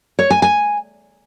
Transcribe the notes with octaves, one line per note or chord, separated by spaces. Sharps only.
C#5
G#5
G#5